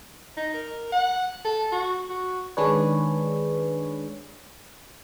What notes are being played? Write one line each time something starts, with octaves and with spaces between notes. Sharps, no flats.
D#4
A#4
F#5
A4
F#4
F#4
D#3 G#3 D4 G#4 B4 C#5